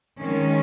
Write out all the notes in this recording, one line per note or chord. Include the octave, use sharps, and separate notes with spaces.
D#3 G#3 C#4